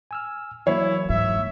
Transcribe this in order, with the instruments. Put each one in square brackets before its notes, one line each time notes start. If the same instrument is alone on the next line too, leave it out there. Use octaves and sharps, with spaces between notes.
[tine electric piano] G#5 E6 F6
[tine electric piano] E3 F#3 A#3 [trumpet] E4 [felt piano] C#5
[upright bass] G#2 [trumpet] E5